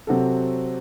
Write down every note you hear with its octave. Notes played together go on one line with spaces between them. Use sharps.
C3 F#3 C4 F#4 A4